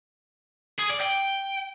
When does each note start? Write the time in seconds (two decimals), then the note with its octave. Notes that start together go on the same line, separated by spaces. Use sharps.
0.79 G#4
0.89 D5
1.00 G5